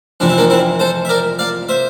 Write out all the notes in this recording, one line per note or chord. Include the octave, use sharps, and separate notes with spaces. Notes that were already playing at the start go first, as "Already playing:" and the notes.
F2 C3 E3 D4
E4
A#3 D4
C4 E4
A4 C5
E5
A#4 D5
D5 F5
C5 E5